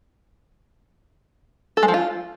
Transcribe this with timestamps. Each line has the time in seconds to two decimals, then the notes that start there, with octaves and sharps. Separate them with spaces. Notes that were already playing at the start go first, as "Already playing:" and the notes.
1.77 A4
1.83 G#3
1.88 F3
1.94 F4